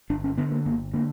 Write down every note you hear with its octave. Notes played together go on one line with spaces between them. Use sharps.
G1 D4
C#4
D3 B3
A#3
G1 A#3
D3 A#3